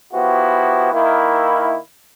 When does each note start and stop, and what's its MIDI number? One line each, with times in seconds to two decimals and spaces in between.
0.13 0.92 53
0.13 0.92 59
0.13 0.92 64
0.13 0.92 66
0.13 0.92 67
0.92 1.76 51
0.92 1.76 58
0.92 1.76 64